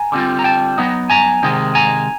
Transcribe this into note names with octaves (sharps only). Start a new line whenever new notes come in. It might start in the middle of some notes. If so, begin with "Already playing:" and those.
Already playing: G#5 A#5
D3 G3 C4 F4
A#5
G5 A5
F#3 B3 D#4
G#5 A#5
C3 D#3 G#3
G#5 A#5